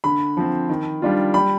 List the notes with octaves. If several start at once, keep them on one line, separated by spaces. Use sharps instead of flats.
D3 B5
F3 C4
D#3
G3 D4 F4
G3 B5